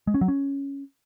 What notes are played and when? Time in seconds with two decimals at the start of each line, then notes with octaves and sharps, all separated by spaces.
0.07 G#3
0.14 C#4
0.21 F#3
0.28 C#4